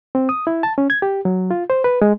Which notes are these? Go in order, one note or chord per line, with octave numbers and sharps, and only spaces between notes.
C4
D#6
E4
A5
C#4
G#6
G4
F#3
F4
C5
B4
G#3